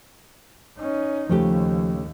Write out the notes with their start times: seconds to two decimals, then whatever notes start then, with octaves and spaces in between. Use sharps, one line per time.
0.78 C#4 D#4
1.30 D#2 C#3 F3 A3 G4